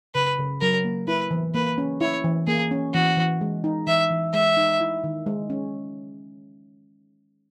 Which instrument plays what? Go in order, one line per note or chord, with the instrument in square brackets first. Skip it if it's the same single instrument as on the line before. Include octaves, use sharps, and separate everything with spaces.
[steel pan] C#3 [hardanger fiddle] B4
[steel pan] C#3
[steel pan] F#3 [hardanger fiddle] A#4
[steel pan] A#3
[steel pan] E4 [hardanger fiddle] B4
[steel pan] E3
[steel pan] A#3 [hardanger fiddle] B4
[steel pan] C#4
[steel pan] E4 [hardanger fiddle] C#5
[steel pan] E3
[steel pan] A#3 [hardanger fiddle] G#4
[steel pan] C#4
[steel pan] E3 [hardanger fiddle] F#4
[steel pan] E3
G#3
D#4
[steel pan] E3 [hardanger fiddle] E5
[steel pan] E3
[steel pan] G#3 [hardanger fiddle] E5
[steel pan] D#4
E4
D#3
G#3
C#4